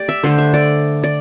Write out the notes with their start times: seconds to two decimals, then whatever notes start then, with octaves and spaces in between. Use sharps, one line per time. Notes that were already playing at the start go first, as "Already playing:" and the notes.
Already playing: A3 G4 D5
0.09 E5
0.24 D3 A3 C5
0.38 E5
0.54 D5
1.04 D5